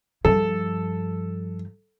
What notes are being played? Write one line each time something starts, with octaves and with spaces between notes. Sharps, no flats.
G2 F3 A4